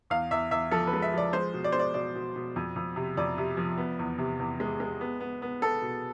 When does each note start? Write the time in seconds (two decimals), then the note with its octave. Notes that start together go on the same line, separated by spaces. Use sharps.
0.10 E2 F5
0.31 E2 E5
0.51 E2 E5
0.71 F3 A4
0.87 B4
0.93 G#3
1.02 E5
1.13 F3 D5
1.33 G#3 C5
1.54 B2
1.64 D5
1.72 G#3 C5
1.79 D5
1.94 B2 D5
2.15 B2
2.36 B2
2.56 F2
2.76 F2
2.96 C3
3.17 F2 D5
3.38 C3
3.57 F3
3.78 B3
3.99 E2
4.18 C3
4.40 E2
4.60 G#3
4.80 G#3
5.01 B3
5.20 B3
5.42 B3
5.62 B3 A4
5.82 B2